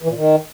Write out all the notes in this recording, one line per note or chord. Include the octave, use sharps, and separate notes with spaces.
E3
A#2
D#3